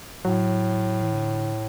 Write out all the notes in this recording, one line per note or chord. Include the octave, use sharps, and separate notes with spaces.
A2 F#3
E3
D3